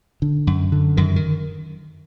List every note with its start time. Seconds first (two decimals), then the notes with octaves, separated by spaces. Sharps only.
0.22 D3
0.47 F#2
0.72 D3
0.97 F#2 D#3
1.16 D#3